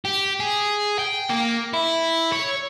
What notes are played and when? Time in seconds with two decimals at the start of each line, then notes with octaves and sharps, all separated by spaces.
0.05 G4
0.40 G#4
0.99 G5
1.29 A#3
1.73 E4
2.32 C#5